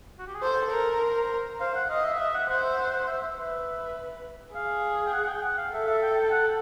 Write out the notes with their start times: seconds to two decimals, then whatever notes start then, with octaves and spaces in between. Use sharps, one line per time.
0.19 F#4
0.27 G4
0.34 G#4
0.42 A4 C5
0.72 A#4
1.02 C5
1.60 C5 F5
1.75 F#5
1.89 D#5 F5
2.04 E5
2.19 D#5 E5
2.34 F#5
2.48 C5 F#5
2.63 E5
2.78 F#5
2.93 F#5
3.08 E5
3.22 E5
3.37 B4
4.55 G#4 F5
5.06 G5
5.13 F#5
5.24 F#5
5.29 G5
5.43 F#5
5.58 F5
5.72 A4 E5
5.87 E5
6.02 G5
6.16 G5
6.31 F#5